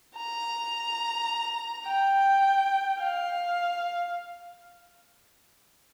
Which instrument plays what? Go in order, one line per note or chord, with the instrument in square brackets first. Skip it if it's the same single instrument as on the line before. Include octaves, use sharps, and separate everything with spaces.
[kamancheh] A#5
G5
F5